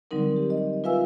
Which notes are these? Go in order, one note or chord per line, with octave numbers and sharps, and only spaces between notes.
D3 F#3 G3 C4 D#4 A#4
G4
D#5
F4 B4 E5 F5 G#5 E6